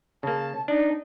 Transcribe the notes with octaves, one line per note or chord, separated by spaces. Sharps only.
C#3 A#3 A5
D4 D#4